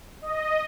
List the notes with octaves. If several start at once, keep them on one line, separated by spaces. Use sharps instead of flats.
D#5